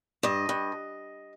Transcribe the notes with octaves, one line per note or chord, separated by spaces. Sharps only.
G2 D#5
G2